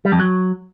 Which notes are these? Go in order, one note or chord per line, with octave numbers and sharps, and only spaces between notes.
G3
F2
F#3